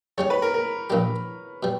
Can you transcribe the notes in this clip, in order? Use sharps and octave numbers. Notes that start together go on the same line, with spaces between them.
C#3 G3 C#4 C#5
B4
A#4
A#4
A#1 A#2 A#3 D4 G4
B2 G3